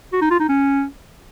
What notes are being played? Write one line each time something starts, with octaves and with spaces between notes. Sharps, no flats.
F#4
D#4
F4
D#4
C#4